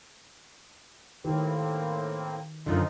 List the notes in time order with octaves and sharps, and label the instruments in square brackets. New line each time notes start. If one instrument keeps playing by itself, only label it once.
[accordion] A2 A#3 C4 [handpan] D#3 G4 B4
[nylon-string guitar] F#2 D3 [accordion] F3 D#4 F4